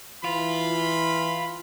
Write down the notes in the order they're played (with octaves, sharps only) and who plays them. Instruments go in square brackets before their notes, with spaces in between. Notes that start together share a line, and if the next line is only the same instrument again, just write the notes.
[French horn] E3 [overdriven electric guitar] F4 [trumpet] B5